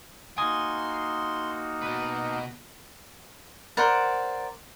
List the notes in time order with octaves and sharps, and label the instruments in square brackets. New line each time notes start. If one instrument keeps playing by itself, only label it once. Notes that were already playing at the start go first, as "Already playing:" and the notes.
[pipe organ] A#3 D#4 F#4 [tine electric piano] G#5 D#6 G#6 [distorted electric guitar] C6
[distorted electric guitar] B2 B4
[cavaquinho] A#4 C5 D5 F#5